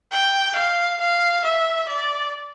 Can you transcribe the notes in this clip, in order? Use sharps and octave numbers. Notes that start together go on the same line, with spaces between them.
G5
F5
F5
E5
D5